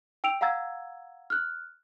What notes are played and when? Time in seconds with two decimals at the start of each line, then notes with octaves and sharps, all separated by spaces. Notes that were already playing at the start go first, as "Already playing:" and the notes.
0.24 G5 E6 D7 F7
0.41 F5 F#5 A#5 E6 G#6 A6
1.30 F6 F#6